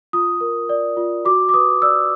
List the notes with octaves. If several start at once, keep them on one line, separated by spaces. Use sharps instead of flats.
F4 D#6
A#4
D5
F4
F#4 D6
D6
B4 D#6
D5 E6